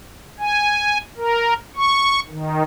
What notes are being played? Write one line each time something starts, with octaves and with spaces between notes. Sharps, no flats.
G#5
A#4
C#6
D#3